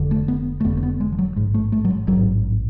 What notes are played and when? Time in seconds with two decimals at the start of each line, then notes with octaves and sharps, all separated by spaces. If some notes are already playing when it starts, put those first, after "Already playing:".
Already playing: F1 F2 D3
0.11 A3
0.28 B3
0.60 A3
0.64 F1 F2 D3 B3
0.77 A3
0.83 B3
1.01 G#3
1.12 F3
1.19 F#3
1.36 A1 G#2 G#3
1.54 A3
1.72 A3
1.85 F#3
1.90 G#3
2.07 A1 G#2 F#3